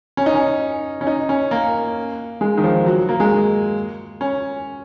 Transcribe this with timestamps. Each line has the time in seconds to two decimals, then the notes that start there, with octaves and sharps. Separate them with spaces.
0.17 C#4
0.26 D#4
0.34 C#4
1.01 C#4
1.07 D#4
1.29 C#4
1.51 A#3
2.41 G#3
2.57 D#3
2.64 F3
2.86 F#3
3.09 A#3
3.20 G#3
4.21 C#4